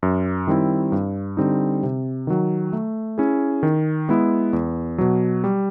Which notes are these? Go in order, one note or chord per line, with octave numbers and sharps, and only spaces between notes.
F#2
D#3 G3 C4 E4
G2
D3 G3 C4 D#4
C3
D#3 F#3
A3
C#4 E4 G#4
D#3
G#3 B3 E4
E2
B2 F#3
G3